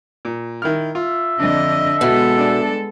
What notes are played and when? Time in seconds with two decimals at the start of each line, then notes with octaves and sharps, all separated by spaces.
0.25 A#2
0.62 D#3 E4 F6
0.95 F4 E5
1.40 F2 D3 D4 D#5
2.01 B2 G#3 E4 A4
2.38 D4 D5